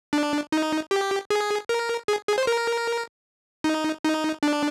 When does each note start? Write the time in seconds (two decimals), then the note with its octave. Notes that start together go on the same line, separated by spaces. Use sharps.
0.13 D4
0.52 D#4
0.91 G4
1.30 G#4
1.69 A#4
2.08 G#4
2.28 G#4
2.38 C5
2.47 A#4
3.64 D#4
4.04 D#4
4.43 D4